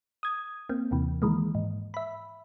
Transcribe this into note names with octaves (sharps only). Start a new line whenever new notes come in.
D#6 G#6
A#3 C4
D#2 C3 E3
D#3 E3 G#3 A#3
G#2
E5 B5